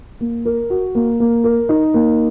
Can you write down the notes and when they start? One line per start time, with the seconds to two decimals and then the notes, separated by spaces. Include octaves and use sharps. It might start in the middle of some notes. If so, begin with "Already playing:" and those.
0.21 A#3
0.45 A#4
0.70 F#4
0.95 A#3
1.20 A#3
1.44 A#4
1.69 D#4
1.94 A#3